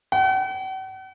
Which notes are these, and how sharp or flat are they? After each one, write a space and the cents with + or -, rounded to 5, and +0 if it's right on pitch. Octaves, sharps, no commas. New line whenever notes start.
F#5 +45